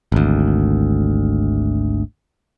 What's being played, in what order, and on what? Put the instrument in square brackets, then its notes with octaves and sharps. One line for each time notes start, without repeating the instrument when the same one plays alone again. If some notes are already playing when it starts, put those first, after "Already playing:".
[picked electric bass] G#1 D2